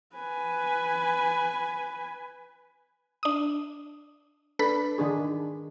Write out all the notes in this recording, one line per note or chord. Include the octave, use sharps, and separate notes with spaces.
B4 G#5
D4 D#6
D4 A4 B4 B5
D#3 D4 G#4